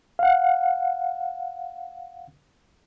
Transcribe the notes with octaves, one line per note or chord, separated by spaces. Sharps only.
F5 F#5